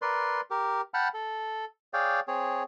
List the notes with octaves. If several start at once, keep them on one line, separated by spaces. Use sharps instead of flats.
A#4 B4 D5 C6
G4 A#4
F#5 G5 A5 B5 F6
A4
G#4 C#5 D5 F5 G5
C4 G#4 C#5